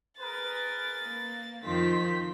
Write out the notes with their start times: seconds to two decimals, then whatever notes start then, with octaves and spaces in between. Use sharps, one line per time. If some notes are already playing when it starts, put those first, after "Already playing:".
0.19 G#4 A#4 B4 A6
1.02 A#3
1.65 F2 D#3 F3 C4 C6 B6